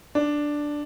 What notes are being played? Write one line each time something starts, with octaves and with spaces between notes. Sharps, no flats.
D4